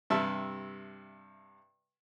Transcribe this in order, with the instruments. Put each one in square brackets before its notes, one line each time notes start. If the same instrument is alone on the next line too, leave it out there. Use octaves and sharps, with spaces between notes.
[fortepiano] G2 C3 E5 A5